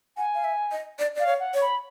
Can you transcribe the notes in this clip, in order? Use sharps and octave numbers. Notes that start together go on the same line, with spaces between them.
F#5 G#5
F5
E5
D#5
D5
D5 F5
C#5
F#5
C#5
B5